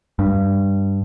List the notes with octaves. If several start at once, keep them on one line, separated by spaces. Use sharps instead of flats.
G2